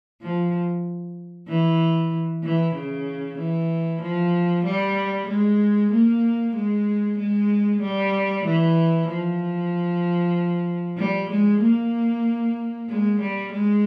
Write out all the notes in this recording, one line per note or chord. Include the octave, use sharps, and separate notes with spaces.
F3
E3
E3
C#3
E3
F3
G3
G#3
A#3
G#3
G#3
G3
E3
F3
G3
G#3
A#3
G#3
G3
G#3